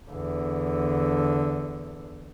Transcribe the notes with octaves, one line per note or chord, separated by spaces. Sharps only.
E2 D3